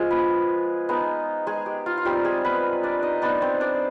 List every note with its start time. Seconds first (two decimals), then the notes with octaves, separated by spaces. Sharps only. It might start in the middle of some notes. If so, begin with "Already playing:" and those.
Already playing: F3 G#3 F4 G#4
0.11 B3 B4
0.89 G#3 B3 D#4
1.47 G#3 G#4
1.66 G4
1.86 F4
1.98 F4
2.05 G3 C4 D#4 G4
2.24 G#3 G#4
2.44 B3 B4
2.83 D4 D5
3.02 D#4 D#5
3.22 B3 D4 D#4 D5
3.42 C4 C5
3.61 D4 D5